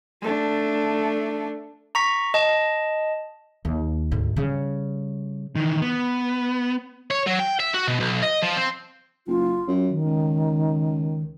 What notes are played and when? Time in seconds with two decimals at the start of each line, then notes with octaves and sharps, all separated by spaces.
0.21 A3 D4
1.95 A#5 C#6 B6
2.34 D#5 A5
3.65 D#2
4.11 D2 G#2
4.36 C#3 G3
5.56 D#3 E3
5.82 B3
7.11 C#5
7.27 F#3
7.40 G5
7.60 E5
7.74 F#4
7.88 B2
8.00 B1
8.22 D#5
8.42 F3
8.57 C4
9.27 F#1 F4
9.68 F#2
9.89 D#3
10.05 C#2